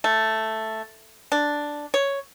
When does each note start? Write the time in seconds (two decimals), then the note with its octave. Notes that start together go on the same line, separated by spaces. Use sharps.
0.04 A3
1.32 D4
1.94 C#5